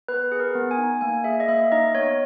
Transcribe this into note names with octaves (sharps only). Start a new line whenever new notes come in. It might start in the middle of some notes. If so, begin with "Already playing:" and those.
B3 B4
G#4
A#4
B3
G#5
D#4
A#3 G#5
G#4 E5
D#5
A#3 E5
D#4 D#5
B3 C#5